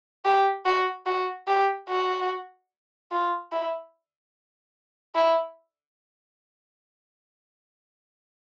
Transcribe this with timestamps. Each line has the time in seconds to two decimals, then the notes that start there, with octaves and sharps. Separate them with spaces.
0.25 G4
0.65 F#4
1.06 F#4
1.47 G4
1.89 F#4
3.12 F4
3.52 E4
5.15 E4